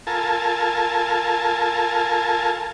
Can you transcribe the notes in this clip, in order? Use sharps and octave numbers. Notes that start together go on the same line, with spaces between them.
F4 A4 A#4 G#5 A5